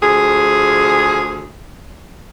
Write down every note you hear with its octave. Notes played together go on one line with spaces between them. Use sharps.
D2 F3 G#4